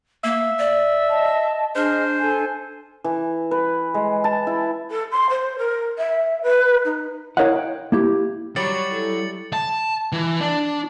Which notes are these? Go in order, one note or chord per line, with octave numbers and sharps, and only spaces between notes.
A#3 E5
D5
D#5 A5
D4 G#4 C5 D#5 F6
A4 G#5
E3
B4
G#3
A5
E4
A4
C6
C5
A#4
E5
B4
D#4
E4 A#4 C#5 D#5 F5 F#5
G5
A#3 E4 G4
F#3 G3 C#5 A6 C#7 F#7
E4 A4
A5
E3
D4